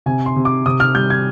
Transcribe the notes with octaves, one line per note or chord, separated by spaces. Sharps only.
C3 G#5
C6
C3
D6
C3 D#6
F6
G3 G6
G#6